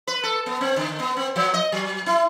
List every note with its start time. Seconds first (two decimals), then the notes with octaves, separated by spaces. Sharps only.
0.07 B4
0.23 A4
0.46 B3
0.61 C4
0.76 D3
1.00 B3
1.16 C4
1.36 F3
1.54 D#5
1.72 F#3
2.06 E4